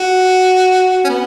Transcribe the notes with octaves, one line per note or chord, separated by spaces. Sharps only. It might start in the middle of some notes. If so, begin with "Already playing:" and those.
Already playing: F#4
C#4
B3